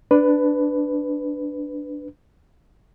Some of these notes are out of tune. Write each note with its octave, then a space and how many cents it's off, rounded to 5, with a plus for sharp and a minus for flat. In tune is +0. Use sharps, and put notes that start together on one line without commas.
D4 +0 B4 +15